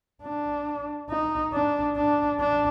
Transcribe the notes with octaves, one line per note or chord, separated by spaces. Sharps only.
D4
D#4
D4
D4
D4